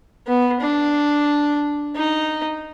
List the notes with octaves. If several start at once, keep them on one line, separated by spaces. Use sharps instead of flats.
B3
D4
D#4